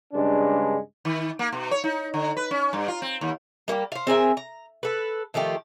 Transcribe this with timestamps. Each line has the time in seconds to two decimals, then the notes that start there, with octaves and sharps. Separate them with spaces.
0.13 G2 C#3 G#3 D4
1.05 D#3
1.39 A#3
1.53 B2
1.71 C#5
1.84 D#4
2.14 D3
2.37 B4
2.51 C#4
2.73 G2
2.88 F4
3.02 C4
3.21 D#2
3.68 G3 A#3 F#4 G4
3.92 C5 F5
4.07 C4 G#4 A#4 E5
4.37 A#5
4.83 A4 B4
5.34 D#3 F3 A3 G4